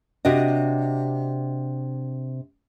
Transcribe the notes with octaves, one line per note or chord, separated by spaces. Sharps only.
C3 D4 F#4 D#5